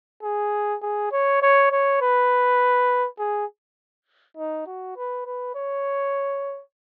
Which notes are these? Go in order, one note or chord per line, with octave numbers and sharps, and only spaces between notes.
G#4
G#4
C#5
C#5
C#5
B4
G#4
D#4
F#4
B4
B4
C#5